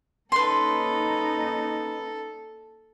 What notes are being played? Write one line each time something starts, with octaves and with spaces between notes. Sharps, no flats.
A#3 C#4 D#4 A4 B4 C6